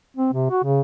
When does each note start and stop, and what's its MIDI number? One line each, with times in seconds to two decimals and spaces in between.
0.17 0.32 60
0.33 0.50 48
0.51 0.62 66
0.64 0.81 49